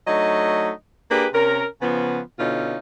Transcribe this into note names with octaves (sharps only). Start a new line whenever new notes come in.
F#3 A3 D4 D#4 D#5
A#3 D4 G4 G#4 B4
C3 C#4 A#4
C#3 F3 B3
B2 D3 C#4 D#4 F4